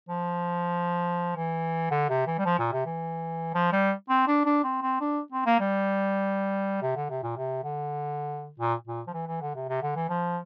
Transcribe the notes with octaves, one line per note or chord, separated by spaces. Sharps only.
F3
E3
D3
C3
E3
G3
F3
A#2
C3
E3
F3
G3
C4
D4
D4
C4
C4
D4
C4
A#3
G3
C3
D3
C3
A#2
C3
D3
A#2
A#2
F3
E3
E3
D3
C3
C3
D3
E3
F3